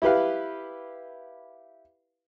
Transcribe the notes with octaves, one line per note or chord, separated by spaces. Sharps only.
E4 G4 B4 F5